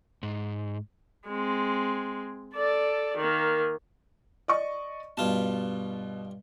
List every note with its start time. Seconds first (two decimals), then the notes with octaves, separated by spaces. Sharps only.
0.23 G#2
1.27 G#3 C4
2.55 A4 D5
3.17 D#3 A#3
4.48 D5 D#5 C#6
5.17 G2 B2 F4 A5